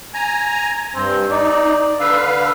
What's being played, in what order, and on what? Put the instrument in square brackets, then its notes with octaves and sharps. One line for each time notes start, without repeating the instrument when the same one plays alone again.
[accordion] G#5 A#5
[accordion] G2 [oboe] C4
[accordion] D#4 [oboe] D5
[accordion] D3 B4 F5 [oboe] E6